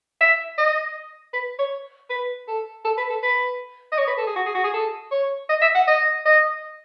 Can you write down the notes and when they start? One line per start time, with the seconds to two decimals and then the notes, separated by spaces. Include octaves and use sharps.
0.21 E5
0.58 D#5
1.33 B4
1.59 C#5
2.10 B4
2.48 A4
2.85 A4
2.97 B4
3.10 A4
3.23 B4
3.92 D#5
3.98 C#5
4.07 B4
4.17 A4
4.27 G#4
4.36 F#4
4.46 G#4
4.55 F#4
4.64 G#4
4.74 A4
5.11 C#5
5.49 D#5
5.62 E5
5.75 F#5
5.88 D#5
6.25 D#5